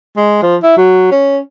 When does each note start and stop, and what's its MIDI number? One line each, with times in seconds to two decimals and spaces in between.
0.17 0.39 56
0.42 0.57 53
0.62 0.76 64
0.77 1.11 54
1.11 1.38 61